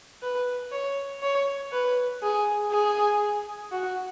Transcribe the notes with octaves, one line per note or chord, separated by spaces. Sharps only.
B4
C#5
C#5
B4
G#4
G#4
F#4